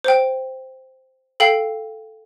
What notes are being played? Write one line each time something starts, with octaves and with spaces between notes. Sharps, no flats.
C5 G5
A4 F5 G5 C7